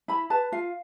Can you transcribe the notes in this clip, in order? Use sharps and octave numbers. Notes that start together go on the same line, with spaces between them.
E4 B5
B4 A5
F4 F5